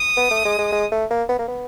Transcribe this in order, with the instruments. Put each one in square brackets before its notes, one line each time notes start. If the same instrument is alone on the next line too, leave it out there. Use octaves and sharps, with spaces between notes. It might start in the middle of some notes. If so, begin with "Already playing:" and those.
Already playing: [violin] D#6
[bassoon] B3
A3
G#3
G#3
G#3
A3
A#3
B3
A#3
B3